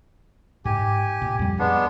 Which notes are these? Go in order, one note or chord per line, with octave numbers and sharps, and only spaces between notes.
G#2 G4 G#5
A#2
F2 G3
G#3 B3 D4